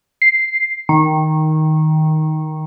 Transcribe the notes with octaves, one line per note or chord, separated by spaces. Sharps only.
C7
D#3